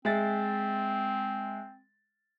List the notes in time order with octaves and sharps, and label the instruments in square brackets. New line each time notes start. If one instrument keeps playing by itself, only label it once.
[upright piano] G#3 E5 A6 [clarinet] C4